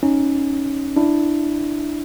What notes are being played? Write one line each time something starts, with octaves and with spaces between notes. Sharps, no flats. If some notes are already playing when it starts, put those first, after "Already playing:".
C#4 D#4
D4 E4